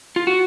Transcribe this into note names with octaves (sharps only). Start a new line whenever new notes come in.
F4
F#4